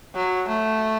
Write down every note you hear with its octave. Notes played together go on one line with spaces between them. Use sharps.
F#3
A3